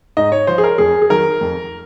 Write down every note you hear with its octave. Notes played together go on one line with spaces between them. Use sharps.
G#2 D#5
C#5
F3 C5
G#4
A#4
F2 G#4
G#4
D#3 F#3 A#4
F2